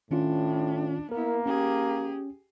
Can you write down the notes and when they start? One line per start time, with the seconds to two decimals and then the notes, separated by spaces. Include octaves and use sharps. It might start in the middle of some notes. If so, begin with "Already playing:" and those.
0.11 A2 D#3 C#4 D4 F4
1.11 A#3 B3 E4 A#4
1.46 C#4 G4 G#4